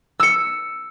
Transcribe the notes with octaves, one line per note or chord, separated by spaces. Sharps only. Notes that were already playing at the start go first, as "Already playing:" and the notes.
E6 C#7